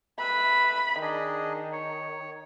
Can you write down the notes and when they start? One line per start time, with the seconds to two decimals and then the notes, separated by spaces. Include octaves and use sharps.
0.19 B4 E5 B5
1.02 D#3 D4 G#4 D#5
1.72 C#5